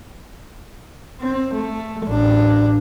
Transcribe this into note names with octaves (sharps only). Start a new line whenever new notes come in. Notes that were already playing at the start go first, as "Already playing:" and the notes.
C4
A3
A1 D4